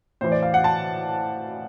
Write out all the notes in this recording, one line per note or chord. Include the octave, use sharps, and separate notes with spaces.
A2 E3 C5
D5
F5
F#5
A5